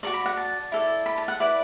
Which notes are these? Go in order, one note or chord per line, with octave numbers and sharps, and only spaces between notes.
F#4 A4 D5 D6
B5
F#5
A5
E4 A4 D5
B5
A5
F#5
E4 B4 D5